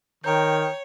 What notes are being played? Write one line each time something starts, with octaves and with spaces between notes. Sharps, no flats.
D#3 C#5 G5 A#5 G6